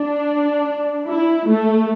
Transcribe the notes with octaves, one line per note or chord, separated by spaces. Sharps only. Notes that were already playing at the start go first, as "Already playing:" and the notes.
Already playing: D4
E4
A3